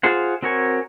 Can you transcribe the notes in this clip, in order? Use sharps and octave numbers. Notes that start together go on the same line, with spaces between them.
F4 G#4 C5 F#5
C4 F#4 A#4 C#5 G#5